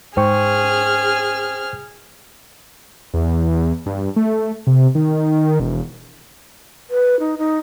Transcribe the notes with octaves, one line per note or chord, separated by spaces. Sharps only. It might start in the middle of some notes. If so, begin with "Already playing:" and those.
G#2 G#4 C5 G5 C#6 F6
E2
G2
A3
C3
D#3
E1
B4
D#4
D#4